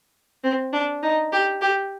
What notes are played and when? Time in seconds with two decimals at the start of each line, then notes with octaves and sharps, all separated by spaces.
0.44 C4
0.73 D4
1.03 D#4
1.33 G4
1.62 G4